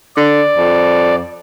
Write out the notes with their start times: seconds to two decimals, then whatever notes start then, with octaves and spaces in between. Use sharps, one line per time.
0.17 D3 D5
0.57 F2